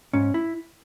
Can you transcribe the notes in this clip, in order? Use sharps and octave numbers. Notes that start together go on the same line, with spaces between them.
G#2 C#4
E4